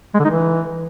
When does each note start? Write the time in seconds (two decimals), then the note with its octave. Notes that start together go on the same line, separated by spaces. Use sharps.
0.14 G#3
0.20 D3
0.25 D#4
0.30 E3